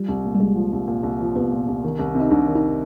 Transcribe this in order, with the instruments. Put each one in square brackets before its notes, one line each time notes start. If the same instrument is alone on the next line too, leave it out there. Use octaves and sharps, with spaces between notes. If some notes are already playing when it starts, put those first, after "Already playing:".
Already playing: [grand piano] F3 [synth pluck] G3
[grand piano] C2
A#2
[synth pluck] G3
[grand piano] C2 [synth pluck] G#3
[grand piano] F3
C2
A#2
C2
F3
[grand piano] C2 [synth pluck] B3
[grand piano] A#2
C2
D#3
C2
[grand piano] C3 [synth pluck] D#4
[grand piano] C2 [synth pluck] D4
[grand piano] D#3
[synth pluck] D#4